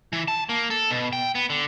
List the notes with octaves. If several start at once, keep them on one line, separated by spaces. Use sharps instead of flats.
E3
A5
A#3
A4
B2
G5
B3
D3